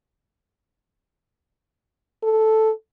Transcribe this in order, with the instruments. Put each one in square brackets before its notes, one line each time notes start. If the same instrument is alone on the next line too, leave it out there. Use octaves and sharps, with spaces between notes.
[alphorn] A4